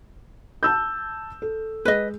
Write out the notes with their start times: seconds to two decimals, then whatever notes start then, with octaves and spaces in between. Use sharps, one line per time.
0.63 A5 E6 G6
1.42 A4
1.85 G#3 G#4 B4 D#5